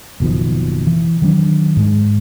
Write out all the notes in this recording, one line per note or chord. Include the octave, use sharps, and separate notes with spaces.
F#1 B2 D#3 F3
E3
D#3 F#3 B3 D4
G#2 G#3